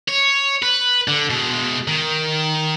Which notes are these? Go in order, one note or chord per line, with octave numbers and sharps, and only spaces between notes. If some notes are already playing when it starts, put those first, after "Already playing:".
C#5
B4
D3
B2 G#3
D#3